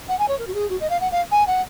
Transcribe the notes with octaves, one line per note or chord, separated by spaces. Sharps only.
F#5
G#5
C#5
A#4
F#4
G#4
F#4
D#5
F5
F#5
F5
G#5
F#5